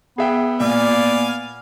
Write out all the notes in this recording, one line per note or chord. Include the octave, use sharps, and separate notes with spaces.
B3 G#4 E5 G5
A#2 D5 F5 G#5